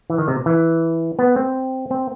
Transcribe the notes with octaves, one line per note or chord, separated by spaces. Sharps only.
E3
D#3
C3
E3
B3
C4
C4